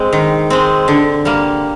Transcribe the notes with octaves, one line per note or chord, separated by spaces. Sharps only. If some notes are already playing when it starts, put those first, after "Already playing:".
Already playing: G#3 C4
D#3
G#3 C4
D3
G3 A#3